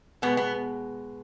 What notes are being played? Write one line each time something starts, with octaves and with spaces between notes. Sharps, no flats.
B2 G#3 B3
B3